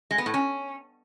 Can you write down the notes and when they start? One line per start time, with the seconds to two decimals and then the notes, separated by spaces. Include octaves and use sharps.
0.11 G#3
0.18 B3
0.26 A2
0.34 C#4